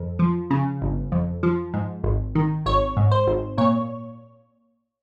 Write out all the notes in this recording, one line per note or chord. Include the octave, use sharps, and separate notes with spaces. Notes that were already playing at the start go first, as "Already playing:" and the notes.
Already playing: F2
F3
C#3
G1
F2
F3
G#2
G#1
D#3
G#1 C#5
G#2
C5
G#1
A#2 C#5